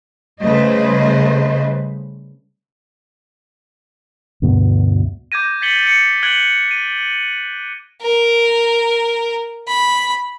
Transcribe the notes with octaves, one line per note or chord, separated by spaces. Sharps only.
C#3 G3 A3 B4 C5 D#5
D2 G2 B2 B3
D6 G6 G#6 A#6 D#7
G#6 A6 B6 C#7 F#7 G7
A6 C#7
F#6 G#6 D7 F#7 G7
D#7
A#4
B5